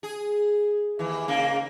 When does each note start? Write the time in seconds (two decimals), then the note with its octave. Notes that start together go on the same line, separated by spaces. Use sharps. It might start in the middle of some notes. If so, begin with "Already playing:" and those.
0.03 G#4
0.99 D#2 E3
1.28 G#2 C#3 A#3